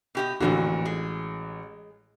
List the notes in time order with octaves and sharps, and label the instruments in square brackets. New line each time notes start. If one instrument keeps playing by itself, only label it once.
[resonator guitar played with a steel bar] B2 G4 D#5
[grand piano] A1 F#4 [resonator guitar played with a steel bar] F2 A#2 D3
[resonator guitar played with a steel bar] G#3